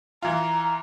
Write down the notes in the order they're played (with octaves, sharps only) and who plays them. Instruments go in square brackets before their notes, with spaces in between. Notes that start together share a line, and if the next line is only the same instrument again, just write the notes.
[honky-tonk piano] E3 F4 [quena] A#5